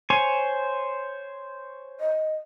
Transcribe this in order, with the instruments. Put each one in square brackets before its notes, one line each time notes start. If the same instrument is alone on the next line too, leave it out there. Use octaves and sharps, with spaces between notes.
[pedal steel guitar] C5 C#5 G#5
[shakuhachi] D#5